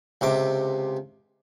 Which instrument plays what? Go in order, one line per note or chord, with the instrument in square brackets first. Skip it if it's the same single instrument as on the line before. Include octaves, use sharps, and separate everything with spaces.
[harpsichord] C#2 C3 D6